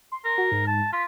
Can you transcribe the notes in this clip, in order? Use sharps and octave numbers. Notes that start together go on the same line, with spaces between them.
C6
A#4
F#4
G#2
A5
F4 B6